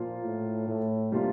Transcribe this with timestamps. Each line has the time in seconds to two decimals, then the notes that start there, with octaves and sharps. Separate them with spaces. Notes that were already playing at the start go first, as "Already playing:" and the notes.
Already playing: A#2 F3 A#3 F4
0.24 A2
0.68 A2
1.12 C3 G3 A#3 D4 F4